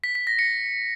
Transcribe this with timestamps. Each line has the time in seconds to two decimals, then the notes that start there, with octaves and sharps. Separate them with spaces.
0.04 B6
0.15 B6
0.27 A#6
0.39 C#7